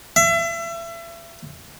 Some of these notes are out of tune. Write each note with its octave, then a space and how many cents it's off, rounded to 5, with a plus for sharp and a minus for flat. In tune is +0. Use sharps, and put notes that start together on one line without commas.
E5 +35